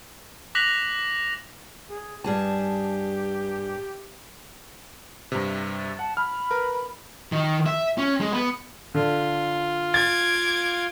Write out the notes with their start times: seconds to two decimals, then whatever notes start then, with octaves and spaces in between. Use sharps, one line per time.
0.55 D6 F#6 A#6 B6 F7 F#7
1.90 G#4
2.24 G2 G4 G#4 A5
5.32 G2 C3
5.78 A6
5.99 F#5 A5
6.17 B5 F6
6.51 A#4 B4
7.32 D#3
7.66 E5
7.98 C#4
8.21 G#3
8.33 B3
8.94 D3 F4
9.94 D6 G#6 A6